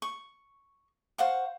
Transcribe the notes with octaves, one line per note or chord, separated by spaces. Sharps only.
C#6
C5 F5 F#5 C#6